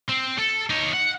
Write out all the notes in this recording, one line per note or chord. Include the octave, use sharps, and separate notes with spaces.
C4
A4
D#4 C#5
F#5